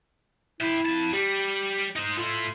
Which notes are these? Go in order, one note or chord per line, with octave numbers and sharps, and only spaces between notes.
E4 E5 G5
F2 A5
G3 G4
D#4 C5
A3 E4 F4